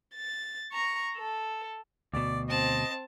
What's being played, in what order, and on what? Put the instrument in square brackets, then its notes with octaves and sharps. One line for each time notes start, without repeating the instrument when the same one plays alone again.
[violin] A6
A#5 C#6
A4
[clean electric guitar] D2 B2 [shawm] D5
[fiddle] C4 A5 [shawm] D#5